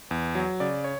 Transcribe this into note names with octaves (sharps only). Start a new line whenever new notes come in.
E2
F#3
C#3 D5
C#5